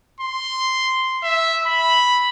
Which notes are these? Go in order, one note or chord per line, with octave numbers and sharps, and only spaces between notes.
C6
E5
B5